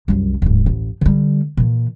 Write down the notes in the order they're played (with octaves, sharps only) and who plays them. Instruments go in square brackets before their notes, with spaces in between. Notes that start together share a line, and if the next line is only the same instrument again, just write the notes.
[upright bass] C2 F#2
D1 G#2
A1
D3 G3
A#2 E3